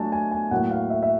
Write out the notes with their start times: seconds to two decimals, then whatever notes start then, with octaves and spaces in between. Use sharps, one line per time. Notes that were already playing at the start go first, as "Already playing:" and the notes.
Already playing: F#3 A3 D4 F4 G#5 A5
0.12 G#5
0.31 G#5
0.51 A2 F#3 A#3 F#5
0.71 F5
0.90 E5
1.03 E5